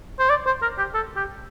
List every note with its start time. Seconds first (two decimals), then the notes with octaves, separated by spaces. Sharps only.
0.19 C5
0.30 D5
0.46 C5
0.62 A#4
0.78 G4
0.94 A4
1.16 G4